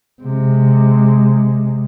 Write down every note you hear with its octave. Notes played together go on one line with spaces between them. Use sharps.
C3 G#3